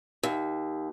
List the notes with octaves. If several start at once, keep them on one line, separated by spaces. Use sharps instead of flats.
D#2